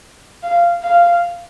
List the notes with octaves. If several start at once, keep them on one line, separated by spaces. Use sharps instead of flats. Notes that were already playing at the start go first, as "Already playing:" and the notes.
F5
F5